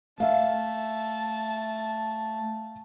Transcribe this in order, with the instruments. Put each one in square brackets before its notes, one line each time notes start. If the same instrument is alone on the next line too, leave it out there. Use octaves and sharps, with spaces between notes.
[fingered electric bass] A3 [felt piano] E5 F5 [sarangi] A5